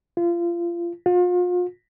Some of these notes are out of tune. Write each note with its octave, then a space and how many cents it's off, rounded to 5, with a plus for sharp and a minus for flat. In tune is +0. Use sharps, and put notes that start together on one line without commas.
F4 -25
F4 +40